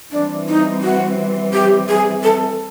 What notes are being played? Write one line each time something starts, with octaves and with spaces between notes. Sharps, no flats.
E3 G3 C4 D4
D#4
F#4
G4
G#4
A4